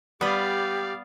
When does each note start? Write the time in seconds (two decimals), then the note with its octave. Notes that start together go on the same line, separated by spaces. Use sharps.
0.21 G3 B3 G4 B4 D5 F5